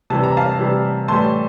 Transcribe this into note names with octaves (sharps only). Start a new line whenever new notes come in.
C3 E3 G3 A5
A#5
F5 A5
C3 E3 G3
A2 E3 G3 A5 C6